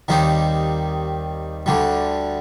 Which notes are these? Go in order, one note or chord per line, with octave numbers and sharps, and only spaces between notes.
D#2 D#3 G3 C4 D#4
D2 D3 G3